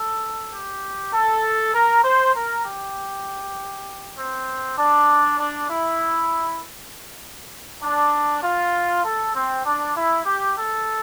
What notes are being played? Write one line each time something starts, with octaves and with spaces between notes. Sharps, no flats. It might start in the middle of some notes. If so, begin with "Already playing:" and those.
Already playing: A4
G4
A4
A#4
C5
A#4
G4
C4
D4
D4
E4
D4
F4
A4
C4
D4
E4
G4
A4